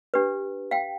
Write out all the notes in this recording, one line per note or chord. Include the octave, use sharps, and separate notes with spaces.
D4 G4 B4
F5 G5